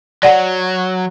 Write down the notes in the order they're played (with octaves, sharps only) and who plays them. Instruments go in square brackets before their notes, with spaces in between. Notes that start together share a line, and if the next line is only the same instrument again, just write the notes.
[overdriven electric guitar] F#3 [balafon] D5 F#5